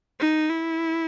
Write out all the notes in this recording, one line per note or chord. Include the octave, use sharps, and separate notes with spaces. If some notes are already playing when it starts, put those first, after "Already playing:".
D#4
E4